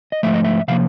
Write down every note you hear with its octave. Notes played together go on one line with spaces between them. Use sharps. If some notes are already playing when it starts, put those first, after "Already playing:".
D#5
G#2 F3 A3 E5
D#5
E5
C3 F3 A#3 F5